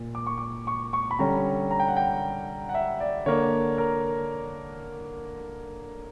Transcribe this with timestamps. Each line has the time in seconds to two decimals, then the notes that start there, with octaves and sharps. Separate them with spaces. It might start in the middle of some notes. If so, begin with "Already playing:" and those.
Already playing: A#2
0.15 D6
0.27 C#6
0.38 D6
0.67 C#6
0.93 C#6
1.11 B5
1.19 D3 G3 C#4 A#5
1.71 A#5
1.80 G5
1.88 F#5
1.97 G5
2.69 F#5
2.75 E5
3.00 D5
3.26 D3 A#3 D4 C#5
3.78 A#4